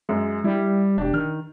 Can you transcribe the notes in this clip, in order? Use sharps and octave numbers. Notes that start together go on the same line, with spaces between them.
F#2 G#3
G3 E4
E1 D4 G4
D#3 F6